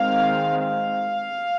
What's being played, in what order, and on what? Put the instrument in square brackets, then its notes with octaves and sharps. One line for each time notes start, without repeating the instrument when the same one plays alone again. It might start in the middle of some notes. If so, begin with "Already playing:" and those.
Already playing: [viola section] D#3 G#3 C4 F5
F5